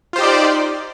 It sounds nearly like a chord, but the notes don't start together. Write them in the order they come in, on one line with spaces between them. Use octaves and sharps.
F4 C5 G4 D#4 D5